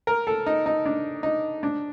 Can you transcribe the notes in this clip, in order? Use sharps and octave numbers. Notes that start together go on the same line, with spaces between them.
A#4
A4
D#4
D#4
D4
D#4
D4